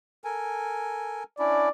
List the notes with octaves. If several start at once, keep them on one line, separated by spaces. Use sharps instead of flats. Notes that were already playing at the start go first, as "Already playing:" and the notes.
A4 A#4 G#5
C#4 D4 E4 D5